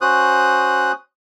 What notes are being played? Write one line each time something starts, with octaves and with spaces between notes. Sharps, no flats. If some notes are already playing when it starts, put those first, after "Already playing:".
C#4 F#4 C5 D#6 F#6